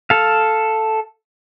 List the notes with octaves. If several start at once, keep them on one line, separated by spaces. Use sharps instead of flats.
A4 F5